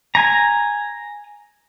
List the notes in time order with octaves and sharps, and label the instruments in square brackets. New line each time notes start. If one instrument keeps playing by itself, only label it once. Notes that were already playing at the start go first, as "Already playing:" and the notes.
[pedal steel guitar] G#5 A#5